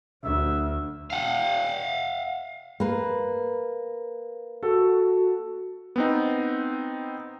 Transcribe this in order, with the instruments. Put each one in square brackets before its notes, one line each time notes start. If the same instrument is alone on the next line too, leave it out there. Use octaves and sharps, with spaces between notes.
[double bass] D2 [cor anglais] E5
[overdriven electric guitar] F5 F#5
[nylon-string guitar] A#3 B4
[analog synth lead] F#4 [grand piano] A4
[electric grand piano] B3 C4 D#4